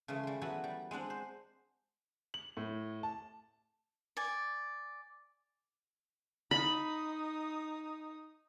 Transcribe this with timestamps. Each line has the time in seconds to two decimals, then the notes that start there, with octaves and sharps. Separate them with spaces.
0.08 C#3 E3 G#3 A3
0.23 G3 C6
0.41 E3 F#3 B3 F#4 A4
0.64 G3
0.91 G#3 C4 D4 F#5
1.10 C5
2.34 F#7
2.57 A2
3.03 A5
4.17 D5 G#5
6.51 D#4 B5 D#6